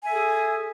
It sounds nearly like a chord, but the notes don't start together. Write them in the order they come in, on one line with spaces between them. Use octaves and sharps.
G#5 E5 A4 G#4